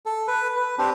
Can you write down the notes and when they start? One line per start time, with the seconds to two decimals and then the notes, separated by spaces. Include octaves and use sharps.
0.06 A4
0.28 B4
0.56 B4
0.78 C4 D4 G4